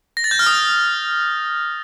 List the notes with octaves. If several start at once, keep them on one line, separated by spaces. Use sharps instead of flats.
A#6
A6
G6
F6
D#6